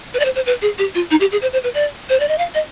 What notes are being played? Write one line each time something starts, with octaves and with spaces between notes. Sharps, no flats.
B4
D5
C5
C5
B4
G#4
G4
F4
D#4
G4
G#4
C5
C5
B4
D5
C5
D5
D#5
F5
D#5